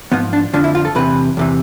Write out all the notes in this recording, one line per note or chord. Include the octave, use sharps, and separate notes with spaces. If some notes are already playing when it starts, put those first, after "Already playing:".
G#2 F3 B3
D4
F2 D3 F3 D4
E4
F4
A4
E2 C3 E3 B4
E2 C3 E3